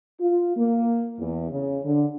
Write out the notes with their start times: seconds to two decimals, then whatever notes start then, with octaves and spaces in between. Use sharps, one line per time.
0.21 F4
0.57 A#3
1.20 E2
1.51 C#3
1.85 D3